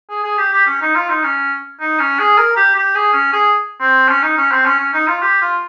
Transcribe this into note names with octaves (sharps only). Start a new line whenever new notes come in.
G#4
G#4
G4
G4
C#4
D#4
F4
D#4
C#4
D#4
C#4
G#4
A#4
G4
G4
G#4
C#4
G#4
C4
C#4
D#4
C#4
C4
C#4
C#4
D#4
F4
G4
F4